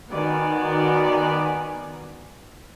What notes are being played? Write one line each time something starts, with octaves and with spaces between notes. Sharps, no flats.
D#3 B3 F#4 D5 G#5